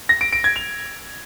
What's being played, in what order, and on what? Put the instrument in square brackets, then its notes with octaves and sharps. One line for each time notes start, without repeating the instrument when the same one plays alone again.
[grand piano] A#6
D7
D7
G#6
F7